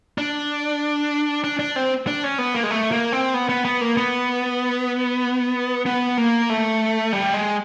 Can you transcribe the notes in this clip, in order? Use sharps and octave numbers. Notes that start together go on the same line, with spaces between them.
D4
D4
D4
C4
D4
C#4
B3
A#3
G#3
A3
A#3
C4
B3
B3
B3
A#3
B3
B3
A#3
A3
G3
G#3